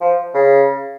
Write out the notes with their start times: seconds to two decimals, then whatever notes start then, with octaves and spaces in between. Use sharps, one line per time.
0.01 F3
0.34 C#3